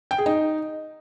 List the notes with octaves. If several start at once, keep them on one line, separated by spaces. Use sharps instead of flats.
G5
G#4
D#4